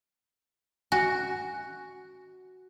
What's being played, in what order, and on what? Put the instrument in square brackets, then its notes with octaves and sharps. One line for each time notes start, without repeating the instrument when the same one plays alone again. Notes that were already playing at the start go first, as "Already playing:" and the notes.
[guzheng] F#4 [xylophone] G#5